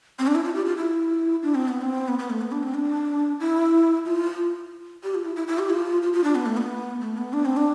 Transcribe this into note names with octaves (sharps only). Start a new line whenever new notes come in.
C4
D4
E4
F4
G4
F4
E4
D4
C4
B3
C4
B3
B3
A3
B3
D4
C4
D4
E4
F4
G4
F4
E4
E4
E4
G4
F4
F4
F4
D4
B3
A3
B3
A3
B3
D4
C4
D4